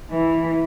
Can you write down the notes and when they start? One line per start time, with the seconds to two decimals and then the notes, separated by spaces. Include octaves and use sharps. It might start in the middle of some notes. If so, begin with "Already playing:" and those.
0.11 E3